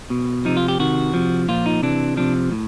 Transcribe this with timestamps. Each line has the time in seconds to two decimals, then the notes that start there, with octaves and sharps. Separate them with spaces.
0.10 B2
0.45 C3 F3 D#4
0.57 F4
0.68 G4
0.79 C3 D#3 F#4
1.14 C3 F3
1.48 A#2 F3 F4
1.66 D#4
1.82 C3 E3 D4
2.17 C3 F3 D4
2.52 A2